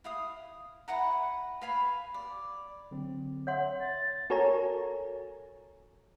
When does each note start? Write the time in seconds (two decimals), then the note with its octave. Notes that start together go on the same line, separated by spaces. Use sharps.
0.04 E4 F5 D#6
0.88 E4 B4 F#5 A#5
1.61 B4 F5 G#5 B5
2.14 D5
2.91 D3 F#3 C4
3.47 C#5 E5 F#5 C6
3.81 A6
4.30 F#4 A4 A#4 C#5 G#5 A#5